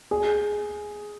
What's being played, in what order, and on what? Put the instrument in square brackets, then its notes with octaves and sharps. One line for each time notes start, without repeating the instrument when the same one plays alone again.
[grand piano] G#4